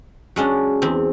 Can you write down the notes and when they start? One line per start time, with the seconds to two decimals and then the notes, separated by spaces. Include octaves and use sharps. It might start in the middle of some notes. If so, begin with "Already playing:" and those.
0.36 F#3 G#3 C#4 D4
0.82 E2 C4